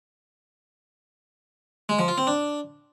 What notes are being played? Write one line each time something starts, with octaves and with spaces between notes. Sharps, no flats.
G#3
F3
F4
C4
D4